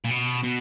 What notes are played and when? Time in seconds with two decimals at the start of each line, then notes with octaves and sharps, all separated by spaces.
0.04 A#2
0.10 B2
0.43 B2